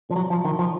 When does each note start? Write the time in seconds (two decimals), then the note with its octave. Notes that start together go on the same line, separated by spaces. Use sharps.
0.11 F3
0.16 F#3
0.30 F3
0.45 D#3
0.59 F3